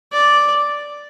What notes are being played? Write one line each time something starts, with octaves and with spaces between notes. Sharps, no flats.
D5